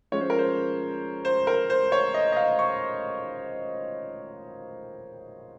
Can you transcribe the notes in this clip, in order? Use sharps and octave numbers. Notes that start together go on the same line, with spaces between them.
F3 G#3 C#4 C#5
C5
A#4
C5
C5
A#4
C5
C#5
D#5
D#5
F5
C#6